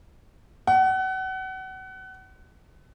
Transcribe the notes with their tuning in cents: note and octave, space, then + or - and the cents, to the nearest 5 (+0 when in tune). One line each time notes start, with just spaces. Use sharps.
F#5 +30